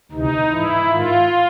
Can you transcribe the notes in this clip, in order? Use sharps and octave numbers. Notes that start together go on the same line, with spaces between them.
D2 C3 E3 D#4
G#2 E3 E4
G#2 D#3 F4